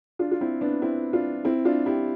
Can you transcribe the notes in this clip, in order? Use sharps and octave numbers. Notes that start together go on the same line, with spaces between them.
D4 F4
F4
C4 E4
B3 D4
C4 E4
D4 F4
C4 E4
D4 F4
E4 G4